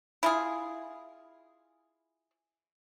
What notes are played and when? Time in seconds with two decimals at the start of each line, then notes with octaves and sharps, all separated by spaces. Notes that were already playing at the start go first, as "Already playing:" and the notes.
0.23 E4 F4 G#4